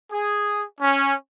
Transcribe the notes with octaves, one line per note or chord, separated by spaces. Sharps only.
G#4
C#4